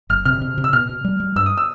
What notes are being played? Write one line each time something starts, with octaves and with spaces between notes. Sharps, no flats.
F#1 F6
C3 F6
C3
C3
E6
B2 F6
B2
G3
G3
G2 E6
D#6
E6